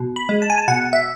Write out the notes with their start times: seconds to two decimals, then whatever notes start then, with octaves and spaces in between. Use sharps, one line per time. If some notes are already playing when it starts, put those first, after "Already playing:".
Already playing: B2
0.16 B5
0.29 G#3
0.42 A5
0.50 G#5
0.58 A5
0.68 B2 F#5
0.93 E5